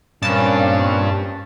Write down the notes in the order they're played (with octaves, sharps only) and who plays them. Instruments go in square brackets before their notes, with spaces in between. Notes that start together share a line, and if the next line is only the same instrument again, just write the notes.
[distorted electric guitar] G2 [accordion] A#2 [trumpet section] C4 C#4 [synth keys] A5 A6